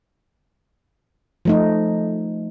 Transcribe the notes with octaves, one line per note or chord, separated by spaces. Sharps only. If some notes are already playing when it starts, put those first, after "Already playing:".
F3 A3 D#4